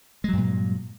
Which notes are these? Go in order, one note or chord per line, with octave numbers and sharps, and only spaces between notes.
G2 A#2 F#3 G#3